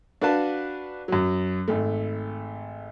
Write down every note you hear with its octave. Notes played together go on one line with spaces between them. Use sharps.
D4 F#4 B4 F5 A5
F#2 F#3
G#1 A3